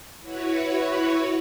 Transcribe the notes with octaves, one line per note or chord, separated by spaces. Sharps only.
E4 F#4 B4 C#5